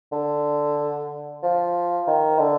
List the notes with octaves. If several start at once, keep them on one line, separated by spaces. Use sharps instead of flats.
D3
F3
D#3
D3